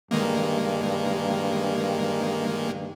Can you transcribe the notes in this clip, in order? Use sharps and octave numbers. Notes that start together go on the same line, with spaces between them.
G2 D#3 G#3 A#3